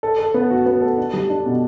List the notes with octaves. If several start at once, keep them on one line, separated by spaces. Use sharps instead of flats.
A4
A4
B3
F#4
B3
A4
D4
G3
D4
B2